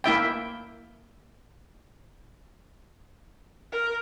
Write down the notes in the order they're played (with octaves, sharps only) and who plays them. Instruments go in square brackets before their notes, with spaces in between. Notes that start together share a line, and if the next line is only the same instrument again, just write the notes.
[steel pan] A#3 E4 E5 G5
[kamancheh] A#4